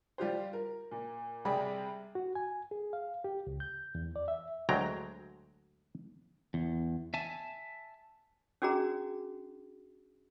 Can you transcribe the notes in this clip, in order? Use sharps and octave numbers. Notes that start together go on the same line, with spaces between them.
G3 F4 G4 C5
A#4
A#2
C3 G3 C4 G#4 B5
F#4
G#5
G#4
F5
G4
C#2
G6
E2
D5
E5
D2 F#3 G#3 G5 A#5
E2
E5 G#5 A5
C#4 D4 F#4 G#4 A#5